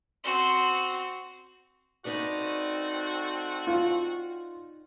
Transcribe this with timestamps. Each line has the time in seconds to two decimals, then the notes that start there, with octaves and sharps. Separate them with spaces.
0.24 C4 F#4
2.05 A3 C4 D#4 F#4 B4 D5
3.67 F4